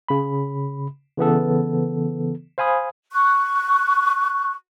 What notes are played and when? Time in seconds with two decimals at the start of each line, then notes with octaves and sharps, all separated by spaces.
0.08 C#3 B5
1.17 C#3 E3 B3 A4
2.58 C5 F5 G#5 B5 D#6
3.12 C#6 F#6